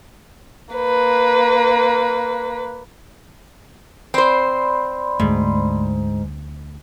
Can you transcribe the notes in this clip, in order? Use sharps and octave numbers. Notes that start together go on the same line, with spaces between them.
A#3 B4
C4 C5 D5 B5 C6
D2 G#2 A3